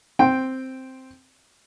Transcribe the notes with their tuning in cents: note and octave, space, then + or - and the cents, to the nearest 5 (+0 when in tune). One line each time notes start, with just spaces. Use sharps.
C4 +0 G5 +0